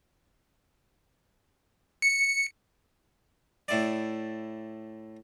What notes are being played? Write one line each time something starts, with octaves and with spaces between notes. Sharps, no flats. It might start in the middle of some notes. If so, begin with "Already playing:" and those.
C#7
A2 E4 D5